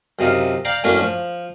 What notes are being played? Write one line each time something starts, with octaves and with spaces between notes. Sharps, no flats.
F#2 C3 D#4 F4
D5 F5 G5 A#5
F#2 A2 A#3 C#4 D4
F3